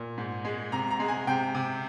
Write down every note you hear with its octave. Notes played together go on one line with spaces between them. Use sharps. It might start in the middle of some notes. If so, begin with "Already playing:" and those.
Already playing: A#2
G#2
G#3
C3 A#5
A#5
G#3
G#5
C3 G5
C3